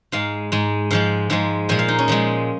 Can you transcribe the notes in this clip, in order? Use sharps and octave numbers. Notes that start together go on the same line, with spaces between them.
G#2 G#3 F5
G#2 G#3
G#2 F3 G#3 F5
G#2 F3 G#3
A#2 F3 G#3 G#5
F5
D#4
C#4
A#2 F3 G#3